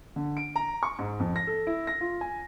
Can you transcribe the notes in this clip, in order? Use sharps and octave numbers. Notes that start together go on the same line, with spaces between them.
D3
D7
A#5
C#6
G#2
F2
A#6
A4
E4
A#6
F4
G#5